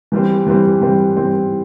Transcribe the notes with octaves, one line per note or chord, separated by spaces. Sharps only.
E3 G3 C4
E3 G3 C4
E3 G3 C4
E3 G3 C4